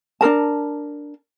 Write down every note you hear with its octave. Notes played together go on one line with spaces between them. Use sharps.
D4 G#4 A#4 A5